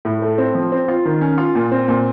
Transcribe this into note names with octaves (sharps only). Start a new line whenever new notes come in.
A2
A3
C4
F3
C4
F4
D#3
C#4
F4
A#2
C4
A#2